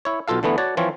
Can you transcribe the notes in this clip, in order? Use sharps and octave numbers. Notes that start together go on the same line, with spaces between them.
E4 C#5
B1 B2 F4 A4 F5
D3 E3 A3 B3
F#4 C#5 D5 A5
E3 F3 C4 F4 C#5